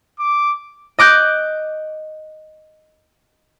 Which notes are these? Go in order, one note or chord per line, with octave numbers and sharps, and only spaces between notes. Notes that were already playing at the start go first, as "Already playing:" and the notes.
D6
D#5 D6 F#6 G6